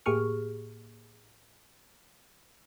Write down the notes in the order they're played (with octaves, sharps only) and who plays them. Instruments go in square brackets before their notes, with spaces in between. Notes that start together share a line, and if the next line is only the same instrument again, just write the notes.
[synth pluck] A2 A#3 G4 G#4 C#6 F6